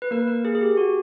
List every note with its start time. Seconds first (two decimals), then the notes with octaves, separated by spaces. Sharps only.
0.02 B4
0.11 A#3 A#4
0.27 A#3 A#4
0.45 G#4
0.55 G#4
0.61 G4
0.77 F#4